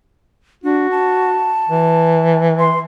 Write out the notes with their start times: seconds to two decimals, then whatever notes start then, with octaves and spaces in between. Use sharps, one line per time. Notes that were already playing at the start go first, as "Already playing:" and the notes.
0.64 D4 F#4
0.91 A5
1.69 E3
2.59 C6